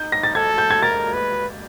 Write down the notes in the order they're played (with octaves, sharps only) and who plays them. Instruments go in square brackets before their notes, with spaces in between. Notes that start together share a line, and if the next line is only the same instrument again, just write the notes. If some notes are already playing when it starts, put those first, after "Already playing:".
Already playing: [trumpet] D#4 [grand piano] G6
[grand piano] A#6
A6
[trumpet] A4 [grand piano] G#6
[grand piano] G6
G#6
[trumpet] A#4 [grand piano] A6
[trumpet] B4